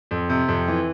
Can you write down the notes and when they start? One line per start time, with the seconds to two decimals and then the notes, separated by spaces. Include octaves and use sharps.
0.11 F2
0.30 C3
0.48 F2
0.68 E3